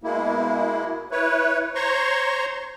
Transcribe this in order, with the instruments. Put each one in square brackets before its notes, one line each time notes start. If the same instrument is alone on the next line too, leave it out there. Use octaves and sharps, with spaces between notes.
[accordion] B2 G#3 A#3 E4
E4 B4 C#5
C5 C#5 A#5 C6 C#6